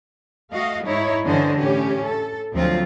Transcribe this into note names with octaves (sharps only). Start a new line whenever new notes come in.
A3 F#4 D#5 F5
G#2 D#4 E4 C#5
G2 D3 E3 C#4 C5 D#5
A2 C#4 G4
A4
D2 F3 F#3 C4 F4